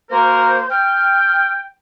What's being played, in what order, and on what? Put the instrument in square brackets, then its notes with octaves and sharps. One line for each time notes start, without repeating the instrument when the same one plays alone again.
[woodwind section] A#3 F#4 A#4 [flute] C5
[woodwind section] G5 [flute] F6